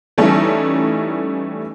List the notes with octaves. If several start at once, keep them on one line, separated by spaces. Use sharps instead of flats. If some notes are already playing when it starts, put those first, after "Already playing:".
E3 G3 A3 C#4 D#4 E4